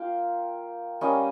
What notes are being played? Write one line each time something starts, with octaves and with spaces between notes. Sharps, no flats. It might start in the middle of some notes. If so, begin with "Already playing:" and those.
Already playing: A#3 F4 F5 G5
G3 A#3 C#4 D#5